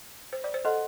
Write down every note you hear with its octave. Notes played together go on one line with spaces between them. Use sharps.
C5
D5
C5
A4 C5 D#5 F#5 C6